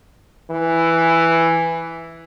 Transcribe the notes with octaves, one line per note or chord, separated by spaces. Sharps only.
E3